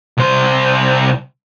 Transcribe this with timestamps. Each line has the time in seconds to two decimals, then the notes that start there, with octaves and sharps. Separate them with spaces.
0.17 C2 C5